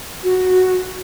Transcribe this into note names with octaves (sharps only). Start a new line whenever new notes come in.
F#4